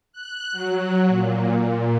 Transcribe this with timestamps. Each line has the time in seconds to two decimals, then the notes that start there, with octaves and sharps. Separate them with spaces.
0.13 F#6
0.52 F#3
1.08 A#2